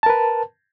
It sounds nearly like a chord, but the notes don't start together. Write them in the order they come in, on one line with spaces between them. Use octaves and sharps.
A5 A#4 B4